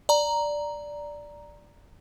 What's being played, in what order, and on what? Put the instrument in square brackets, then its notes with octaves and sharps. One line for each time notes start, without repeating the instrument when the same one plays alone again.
[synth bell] D5 A#5